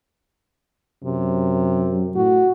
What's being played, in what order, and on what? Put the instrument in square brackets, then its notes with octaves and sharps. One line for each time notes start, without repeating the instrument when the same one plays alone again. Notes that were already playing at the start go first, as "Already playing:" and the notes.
[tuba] F#2 [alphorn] C3
[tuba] A2 [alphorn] F#4